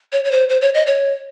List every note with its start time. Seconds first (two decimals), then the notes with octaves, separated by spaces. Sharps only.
0.12 C#5
0.25 C#5
0.31 C5
0.49 C5
0.61 C#5
0.74 D#5
0.87 C#5